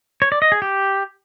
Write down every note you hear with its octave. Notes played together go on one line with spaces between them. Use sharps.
C#5
D5
D#5
G#4
G4